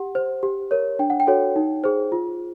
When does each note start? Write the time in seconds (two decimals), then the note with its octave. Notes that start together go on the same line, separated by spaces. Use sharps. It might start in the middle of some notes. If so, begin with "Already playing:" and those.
Already playing: G4 F#5
0.15 C5
0.43 G4
0.71 A#4 C#5
0.99 D4 G5
1.10 F#5
1.20 G5
1.27 F#4 A4 C#5
1.56 D#4
1.84 G#4 C5
2.12 F4